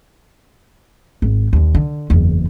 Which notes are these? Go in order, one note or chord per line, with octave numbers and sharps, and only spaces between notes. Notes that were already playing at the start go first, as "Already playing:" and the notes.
G#1
D#2 D3
D3
F#1 E2